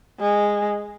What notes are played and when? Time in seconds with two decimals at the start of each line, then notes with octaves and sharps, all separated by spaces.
0.19 G#3